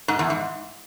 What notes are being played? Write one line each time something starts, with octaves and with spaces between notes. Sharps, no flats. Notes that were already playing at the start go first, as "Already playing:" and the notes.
G#2
E2
G#2